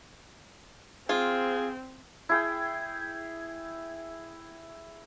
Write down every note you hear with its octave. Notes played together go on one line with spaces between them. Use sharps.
C4 F4 G#4
E4 G#4 G5